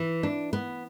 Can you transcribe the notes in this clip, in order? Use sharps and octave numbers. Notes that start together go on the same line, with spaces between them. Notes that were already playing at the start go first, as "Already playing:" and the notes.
Already playing: E3
D4
B3